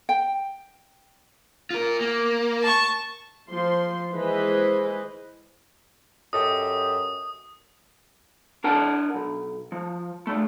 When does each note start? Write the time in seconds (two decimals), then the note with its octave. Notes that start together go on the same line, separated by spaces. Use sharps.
0.09 G5
1.71 F4 A#4
2.01 A#3
2.63 A5 C#6
3.50 F3 C6
4.14 E3 G#3 G#4 B4 C5 D#5
6.33 F#2 G4 A4 D#5 D#6
8.64 D4 A#4 F#5 A5
9.14 B1
9.72 F3
10.27 C#3 A3